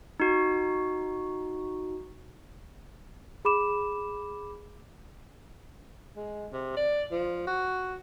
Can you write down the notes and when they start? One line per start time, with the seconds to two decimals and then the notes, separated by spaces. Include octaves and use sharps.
0.20 D#4 F#4
3.45 G#4 B5 D6 E7
6.16 G#3
6.52 C3
6.76 D5
7.11 F3
7.47 F#4